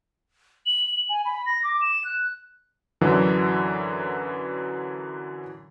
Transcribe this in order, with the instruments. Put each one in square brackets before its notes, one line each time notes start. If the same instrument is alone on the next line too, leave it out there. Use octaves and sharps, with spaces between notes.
[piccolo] F#7
F#7
G#5
B5
A#6
D6
E7
F#6
[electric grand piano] F#2 D3 E3 F#3